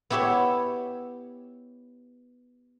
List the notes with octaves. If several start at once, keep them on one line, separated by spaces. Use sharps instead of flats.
B3 E4 G4 C#5 E5